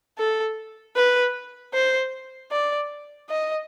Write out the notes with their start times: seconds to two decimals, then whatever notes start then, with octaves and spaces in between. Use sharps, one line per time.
0.18 A4
0.96 B4
1.73 C5
2.51 D5
3.29 D#5